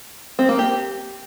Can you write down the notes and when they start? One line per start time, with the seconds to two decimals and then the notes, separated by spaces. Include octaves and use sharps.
0.39 C4
0.49 A#3
0.59 G4